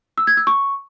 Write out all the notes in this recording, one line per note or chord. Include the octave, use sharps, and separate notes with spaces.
E6
G#6
E6
C#6